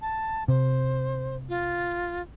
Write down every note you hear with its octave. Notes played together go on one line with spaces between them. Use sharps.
A5
C3 C5
F4